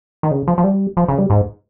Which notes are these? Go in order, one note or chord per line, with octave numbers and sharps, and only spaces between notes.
D#3
C#3
F3
F3
G3
F3
C#3
G3
G#2